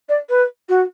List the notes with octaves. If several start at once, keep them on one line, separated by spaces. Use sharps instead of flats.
D5
B4
F#4